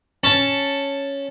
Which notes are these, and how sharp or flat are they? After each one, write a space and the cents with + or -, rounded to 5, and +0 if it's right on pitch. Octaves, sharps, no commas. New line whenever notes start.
C#4 +0 A5 +0